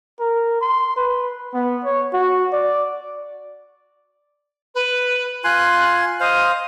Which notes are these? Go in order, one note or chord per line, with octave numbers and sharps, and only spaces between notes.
A#4
C6
B4
B3
C#5
F#4
D5
B4
F4 G#5 C6 F#6
C5 D#5 F5